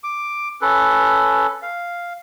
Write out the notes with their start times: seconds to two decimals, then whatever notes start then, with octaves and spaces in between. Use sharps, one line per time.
0.04 D6
0.62 C#4 A4 B4
1.62 F5